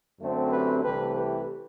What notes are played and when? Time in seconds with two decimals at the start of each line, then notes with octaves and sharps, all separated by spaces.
0.20 F#2 D3 A3 C4
0.51 G4 B4
0.83 C2 C3 E3 A3 G4 B4
1.15 G4 B4